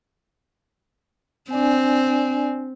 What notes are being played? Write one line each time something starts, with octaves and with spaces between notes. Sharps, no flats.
C4 D4 D5 G#5